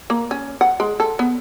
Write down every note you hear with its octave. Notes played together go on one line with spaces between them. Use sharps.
A#3
C#4
F#5
G#3
A4
B3